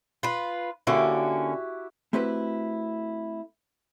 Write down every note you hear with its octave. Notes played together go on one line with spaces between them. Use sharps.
F4 B4
D3 A#3 C#4 E4 F#4 G4
A3 C4 E4 F#4 G4 B4